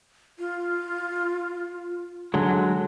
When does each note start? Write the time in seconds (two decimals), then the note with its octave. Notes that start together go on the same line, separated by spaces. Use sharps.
0.39 F4
2.34 D3 F#3 G#3